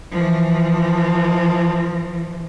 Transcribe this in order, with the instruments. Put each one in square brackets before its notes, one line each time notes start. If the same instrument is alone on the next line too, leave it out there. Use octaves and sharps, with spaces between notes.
[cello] E3 F3